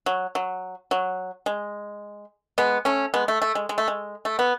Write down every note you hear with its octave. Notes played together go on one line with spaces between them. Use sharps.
F#3
F#3
F#3
G#3
G#3 B3
A3 C#4
G#3 B3
A3
A3
G#3
G#3
A3
G#3
A3
B3